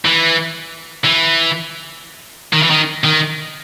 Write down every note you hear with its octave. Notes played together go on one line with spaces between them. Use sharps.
E3
E3
D#3
E3
D#3
D#3